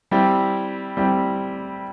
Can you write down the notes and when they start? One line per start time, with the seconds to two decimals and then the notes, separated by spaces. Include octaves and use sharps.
0.11 G3 C4 E4 G4
0.97 G3 C4 E4 G4